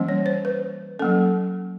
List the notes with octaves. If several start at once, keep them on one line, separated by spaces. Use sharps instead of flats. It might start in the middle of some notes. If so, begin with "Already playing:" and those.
Already playing: E3 G3 A#3 C#4
C#5
C5
B4
F#3 A#3 C#4 A4